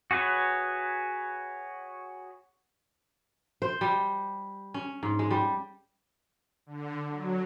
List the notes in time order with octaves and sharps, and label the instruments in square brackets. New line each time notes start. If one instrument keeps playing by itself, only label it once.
[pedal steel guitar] F#4 G#4 B4 C#5
[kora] C5
G3
C#4
G#2
G#3
G3
[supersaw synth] D3
F#3